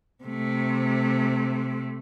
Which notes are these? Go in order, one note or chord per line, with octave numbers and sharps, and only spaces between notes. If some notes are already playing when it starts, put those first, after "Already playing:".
C3 A3